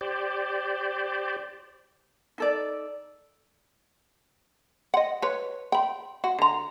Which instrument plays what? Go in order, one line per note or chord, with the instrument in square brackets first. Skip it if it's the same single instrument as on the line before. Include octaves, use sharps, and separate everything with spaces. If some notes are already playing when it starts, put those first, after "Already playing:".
[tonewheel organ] G4 C5 D5
[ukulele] D#4 A4 D5
[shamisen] D#5 F#5
B4 C#5
G5 B5
F#4
D3 A#5